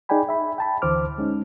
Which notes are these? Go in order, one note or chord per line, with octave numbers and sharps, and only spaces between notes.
D#4 G#4 D5 G5 G#5 B5
E5 B5
G5 A5 B5
D2 D3 E3 C5 D6 F6
G#3 C#4 D#4